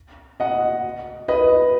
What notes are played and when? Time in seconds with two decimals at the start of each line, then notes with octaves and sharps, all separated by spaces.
0.40 D#5 F#5
1.28 B4 D#5